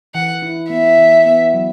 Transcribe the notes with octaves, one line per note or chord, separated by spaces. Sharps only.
E3 F#5
E4
B3 E5
E3
B3
F#3